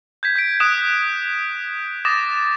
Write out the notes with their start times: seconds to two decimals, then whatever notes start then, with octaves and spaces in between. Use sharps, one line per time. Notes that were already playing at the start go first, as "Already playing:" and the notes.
0.23 G6 G#6 B6
0.36 G6 B6 D7
0.60 D#6 F#6 G6 B6 D7 E7
2.05 D6 D#6 A6 A#6 E7